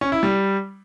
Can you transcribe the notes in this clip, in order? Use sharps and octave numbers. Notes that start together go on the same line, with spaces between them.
C#4
E4
G3